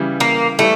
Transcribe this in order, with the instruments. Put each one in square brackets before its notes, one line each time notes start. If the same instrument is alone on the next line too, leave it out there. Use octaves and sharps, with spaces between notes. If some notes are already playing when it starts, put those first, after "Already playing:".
Already playing: [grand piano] C#3 E3 G3
[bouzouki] A#3
[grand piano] E3 G3 [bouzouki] A3